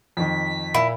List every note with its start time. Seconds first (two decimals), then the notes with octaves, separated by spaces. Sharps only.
0.17 F2 D#3 B6
0.74 A#2 E4 E5